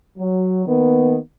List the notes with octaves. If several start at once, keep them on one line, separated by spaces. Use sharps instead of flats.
F#3
D#3 A#3 B3